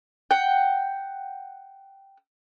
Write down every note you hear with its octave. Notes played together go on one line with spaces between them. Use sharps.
F#5 G5